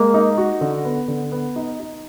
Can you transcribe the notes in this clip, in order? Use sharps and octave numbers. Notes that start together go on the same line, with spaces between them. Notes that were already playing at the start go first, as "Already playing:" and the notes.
Already playing: G#3 A#3
D#4
F#4
D3
B3
D3
B3
D#4
D#4